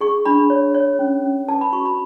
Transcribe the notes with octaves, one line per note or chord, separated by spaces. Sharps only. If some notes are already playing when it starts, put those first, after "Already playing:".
G#4 C#6
D4 B5
C#5
C#5
C#4
C#4
B4 A5
B5
F#4 C#6
B5